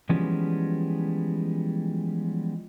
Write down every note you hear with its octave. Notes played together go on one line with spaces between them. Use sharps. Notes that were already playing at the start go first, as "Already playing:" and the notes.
E3 F3 G3 G#3 B3 C#4